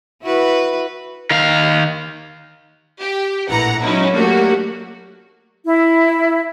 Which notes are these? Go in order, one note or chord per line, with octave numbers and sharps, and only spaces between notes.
E4 F#4 B4
D#3 F5
G4
A#1 A2 E3 F#5 A#5
F#3 G#3 C#4 D#4 E4
F#3 A3 A#3 D4 F#4 G4
E4